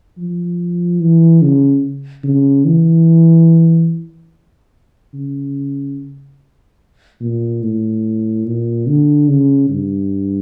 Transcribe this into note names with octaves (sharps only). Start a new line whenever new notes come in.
F3
E3
C#3
C#3
E3
C#3
A#2
A2
A#2
D3
C#3
G2